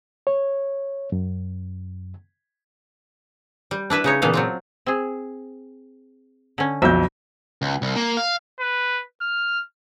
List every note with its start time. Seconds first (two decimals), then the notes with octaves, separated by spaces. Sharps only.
0.27 C#5
1.12 F#2
3.71 G3
3.90 D4 E4 B4 E5
4.04 C#3 D#4 C#5
4.22 A#2 C#3 E3 B3 A4 F5
4.34 F#3 C4 F4
4.86 C4 G#4
6.58 D3 C#4
6.82 B1 F2 E5 G6
7.62 C#2
7.82 C2
7.96 A#3
8.17 F5
8.60 B4
9.21 F6